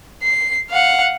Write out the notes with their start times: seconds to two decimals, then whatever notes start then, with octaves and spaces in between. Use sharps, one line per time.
0.23 C7
0.70 F5 F#5